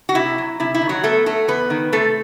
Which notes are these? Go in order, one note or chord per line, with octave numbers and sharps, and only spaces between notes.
F#4
C3 E4
F#3
C3 E4
E4
D#3
F#3 F#4
A3 B3 A4
F#3 A3 A4
E2 B3 B4
D#3
C3 A3 A4